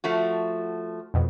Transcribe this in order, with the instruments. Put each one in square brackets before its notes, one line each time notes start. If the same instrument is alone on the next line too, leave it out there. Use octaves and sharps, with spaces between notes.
[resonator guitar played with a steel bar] F3 A3 F#4
[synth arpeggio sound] F2 B2